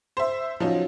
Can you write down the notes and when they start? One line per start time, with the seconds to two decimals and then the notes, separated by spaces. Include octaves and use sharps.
0.17 C5 E5
0.60 F3 F#3 C#4 D#4